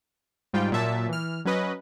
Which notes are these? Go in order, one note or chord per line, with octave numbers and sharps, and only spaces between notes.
G#2 G3 F4 G5
A#2 F#3 E5 A5
E3 F6
F#3 C#4 B4 D#5